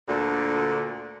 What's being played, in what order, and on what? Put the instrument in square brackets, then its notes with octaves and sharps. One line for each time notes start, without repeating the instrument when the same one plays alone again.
[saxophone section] D2 A#2 D3